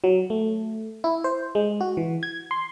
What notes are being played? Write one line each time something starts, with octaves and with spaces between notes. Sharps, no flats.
F#3
A3
E4
C5
G#3
F#4
E3
G#6
C6